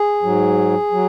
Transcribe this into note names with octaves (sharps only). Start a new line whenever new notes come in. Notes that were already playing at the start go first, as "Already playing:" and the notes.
Already playing: G#4
G#2 F#3
F#3